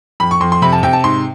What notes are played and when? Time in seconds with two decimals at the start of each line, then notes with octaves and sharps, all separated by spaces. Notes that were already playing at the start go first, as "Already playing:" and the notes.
0.20 F2 B5
0.31 C#6
0.41 F2 C6
0.52 C6
0.62 C3 B5
0.73 A5
0.83 C3 G5
0.93 A5
1.04 G#2 C6